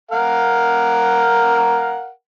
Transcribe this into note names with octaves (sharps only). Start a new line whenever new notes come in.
A#4 F5 F#5